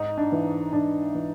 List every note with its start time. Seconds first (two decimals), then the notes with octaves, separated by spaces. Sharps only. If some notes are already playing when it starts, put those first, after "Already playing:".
Already playing: G#2 D#4
0.18 D4
0.32 E3
0.73 G#2 D4
1.15 E3